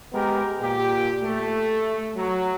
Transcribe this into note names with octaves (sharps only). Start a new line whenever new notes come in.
G#3 B3 G4 A#4
A#2 G4
A3
F#3